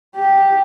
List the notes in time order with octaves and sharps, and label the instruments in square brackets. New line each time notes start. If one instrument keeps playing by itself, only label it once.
[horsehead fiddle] G4